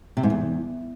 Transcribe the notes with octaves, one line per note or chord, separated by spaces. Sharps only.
C3
G#2
E2